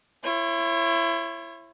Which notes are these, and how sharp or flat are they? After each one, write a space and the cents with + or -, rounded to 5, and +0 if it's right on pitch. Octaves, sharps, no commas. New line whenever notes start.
E4 +30 C#5 -30